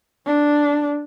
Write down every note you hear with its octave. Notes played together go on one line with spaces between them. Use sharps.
D4